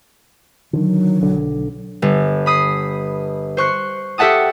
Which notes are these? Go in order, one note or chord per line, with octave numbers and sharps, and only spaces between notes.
D3 D#3 F#3
B1 D3
G1
B5 D#6 C7
C5 C#6 F#6 C7
G4 A4 E5 F#5 A5 D#6